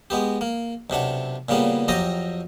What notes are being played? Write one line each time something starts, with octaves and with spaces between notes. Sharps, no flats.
G#3 B3 G4
A#3
B1 C3 D4 F#5
A#2 C#3 G3 A#3 B3
F2 F#3 G4 D#5 A#5